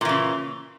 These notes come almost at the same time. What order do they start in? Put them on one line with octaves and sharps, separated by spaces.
A#2 E3 C#3